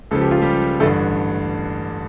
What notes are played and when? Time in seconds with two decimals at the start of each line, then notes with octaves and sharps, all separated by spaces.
0.11 C#2 C#3 F3 A4
0.21 G4
0.31 F4
0.42 G3 G4
0.80 A1 G2 D3 A3 A4